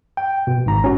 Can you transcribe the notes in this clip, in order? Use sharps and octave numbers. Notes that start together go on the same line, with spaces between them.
G5
B2
G#1 G#2 A#5
C#4 F#4